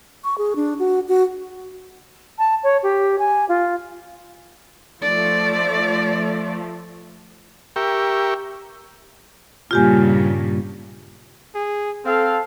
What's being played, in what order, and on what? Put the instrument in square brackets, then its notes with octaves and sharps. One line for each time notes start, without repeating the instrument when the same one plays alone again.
[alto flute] C#6
G#4
D4
F#4
F#4
[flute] A5
C#5
G4
G#5
F4
[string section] F3 A3 [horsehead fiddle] D5
[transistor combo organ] G4 A#4 E5 G5 C#6
[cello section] G2 A#2 C#3 [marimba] F4 G4 G#5
[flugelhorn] G#4
[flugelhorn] C4 [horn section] A4 F5